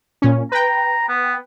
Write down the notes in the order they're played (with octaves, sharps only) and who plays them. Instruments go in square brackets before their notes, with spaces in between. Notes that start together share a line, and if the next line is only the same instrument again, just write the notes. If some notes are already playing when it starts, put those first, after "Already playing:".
[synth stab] A#2 C#4
[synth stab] B4 G5 [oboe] A#5
[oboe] B3